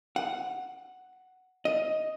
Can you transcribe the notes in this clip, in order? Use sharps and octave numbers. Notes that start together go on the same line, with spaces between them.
F#5
D#5